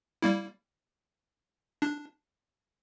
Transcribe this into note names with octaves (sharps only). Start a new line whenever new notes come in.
G3 A#3 E4
D4